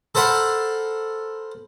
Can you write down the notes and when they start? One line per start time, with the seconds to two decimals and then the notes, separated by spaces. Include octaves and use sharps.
0.15 A4 A#4 C5 F#5 B5